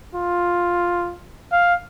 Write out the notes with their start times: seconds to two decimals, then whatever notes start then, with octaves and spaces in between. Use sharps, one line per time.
0.15 F4
1.52 F5